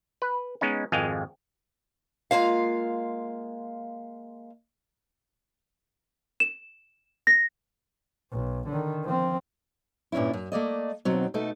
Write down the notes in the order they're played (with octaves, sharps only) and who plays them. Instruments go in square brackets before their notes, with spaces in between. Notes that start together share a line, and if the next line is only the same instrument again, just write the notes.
[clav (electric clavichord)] B4
G#3 B3 C#4 D#4
G#1 F2 G#3 F5 G5 G#5
[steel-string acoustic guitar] G#3 A#3 F4 F5
[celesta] E7
A#6
[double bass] B1
D3 D#3
F3 C4
[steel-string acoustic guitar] G2 A#2 C#4 D4 E4
F#2
A3 A#3 D5 D#5
D#2 B2 F#3 C4
B2 A3 D#4 A4